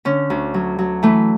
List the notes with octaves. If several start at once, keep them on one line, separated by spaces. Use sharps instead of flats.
D3 C#4
D2
F#3
F#3
E3 A3